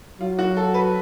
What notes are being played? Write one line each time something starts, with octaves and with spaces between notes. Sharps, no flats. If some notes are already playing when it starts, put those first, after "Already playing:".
F#3 F4
F#4
A4
B4